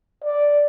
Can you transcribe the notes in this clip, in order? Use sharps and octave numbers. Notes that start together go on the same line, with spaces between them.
D5